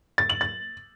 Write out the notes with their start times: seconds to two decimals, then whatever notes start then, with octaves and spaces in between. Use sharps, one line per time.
0.18 A6
0.29 F#7
0.41 A6